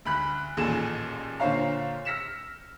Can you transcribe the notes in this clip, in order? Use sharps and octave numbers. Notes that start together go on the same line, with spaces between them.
D2 B5 F#6 B6
A1 D#2 A#2 G#4 A4 E7
A#2 D3 C5 C#5 F5 A#5
E6 F6 A#6 B6 C#7 E7